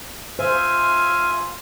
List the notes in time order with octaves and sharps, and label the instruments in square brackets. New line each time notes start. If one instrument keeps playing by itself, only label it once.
[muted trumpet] F4 [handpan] C5 [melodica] E5 F5 [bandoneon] G#5